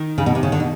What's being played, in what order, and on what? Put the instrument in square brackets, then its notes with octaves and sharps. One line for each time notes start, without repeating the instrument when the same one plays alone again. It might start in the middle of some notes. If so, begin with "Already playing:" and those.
Already playing: [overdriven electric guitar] D#3
[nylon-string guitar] C#3
B2
C3
C#3
D3
B2